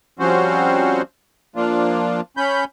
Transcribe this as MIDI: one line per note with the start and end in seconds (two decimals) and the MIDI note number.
0.19 1.02 53
0.19 1.02 55
0.19 1.02 60
0.19 1.02 61
0.19 1.02 66
0.19 1.02 72
1.56 2.21 53
1.56 2.21 58
1.56 2.21 62
1.56 2.21 65
2.37 2.64 61
2.37 2.64 83
2.37 2.64 91